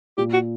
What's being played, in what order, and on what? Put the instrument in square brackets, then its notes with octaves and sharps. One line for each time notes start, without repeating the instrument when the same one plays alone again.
[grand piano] A#2 [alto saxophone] G4
[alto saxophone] F#4